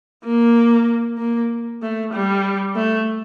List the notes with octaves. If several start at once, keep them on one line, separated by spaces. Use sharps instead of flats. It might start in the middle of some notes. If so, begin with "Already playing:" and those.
A#3
A#3
A3
G3
A3